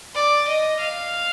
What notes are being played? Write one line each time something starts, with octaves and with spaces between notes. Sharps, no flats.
D5
D#5
F5